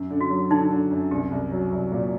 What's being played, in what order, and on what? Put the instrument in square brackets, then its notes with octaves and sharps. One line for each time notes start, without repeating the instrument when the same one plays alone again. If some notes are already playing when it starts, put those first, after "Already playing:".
Already playing: [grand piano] F#2
D3
[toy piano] F#4
[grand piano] F#3
[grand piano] D3 [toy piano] D#4
[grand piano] D3
F#2
[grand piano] C2 [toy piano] G4
[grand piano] C2
F#3
C2
A#2